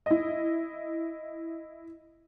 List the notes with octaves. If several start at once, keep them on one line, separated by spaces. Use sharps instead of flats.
E4 D#5